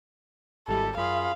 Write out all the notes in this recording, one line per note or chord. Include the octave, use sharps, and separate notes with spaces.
G#1 G3 E4 A4
F#2 F4 G#4 F5 B5